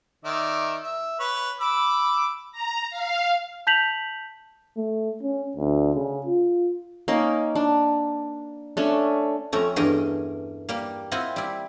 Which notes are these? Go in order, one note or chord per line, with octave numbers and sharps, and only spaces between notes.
D#3 D5 E5
E5
B4 C#5
B5 D6 E6
A#5
F5
A5 G6 B6 F7 F#7
A3
C#4
D2
C#3
F4
A#3 C#4 D#4
D4
A3 C#4 D4
F2 A3 C#4 A#5
E2 G2 A3 A#4 D#5
G3 A#3
C4 E4 F4 D#5 F#5
G3 E4